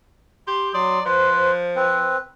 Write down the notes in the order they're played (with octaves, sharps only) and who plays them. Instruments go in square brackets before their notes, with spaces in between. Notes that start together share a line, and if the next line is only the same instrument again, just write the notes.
[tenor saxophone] G4 [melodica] C6
[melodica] F#3 C6 D#6 [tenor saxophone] D5
[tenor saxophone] F3 [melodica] B4 C5
[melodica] C4 B4